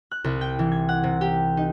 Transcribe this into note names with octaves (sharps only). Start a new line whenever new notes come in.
F#6
C2
G5
E3
G#6
F#5
C3
G4
D#4